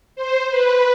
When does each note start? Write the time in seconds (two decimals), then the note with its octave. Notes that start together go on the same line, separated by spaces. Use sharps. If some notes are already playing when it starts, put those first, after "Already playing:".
0.16 C5
0.50 B4